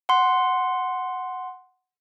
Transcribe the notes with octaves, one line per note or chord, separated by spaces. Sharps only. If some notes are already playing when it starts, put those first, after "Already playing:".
F#5 C6